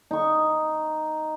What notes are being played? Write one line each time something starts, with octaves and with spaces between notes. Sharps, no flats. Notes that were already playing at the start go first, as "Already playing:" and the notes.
D#4 C#6